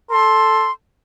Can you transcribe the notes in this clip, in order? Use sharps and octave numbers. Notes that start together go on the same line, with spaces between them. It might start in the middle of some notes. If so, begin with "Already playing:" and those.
A4 C6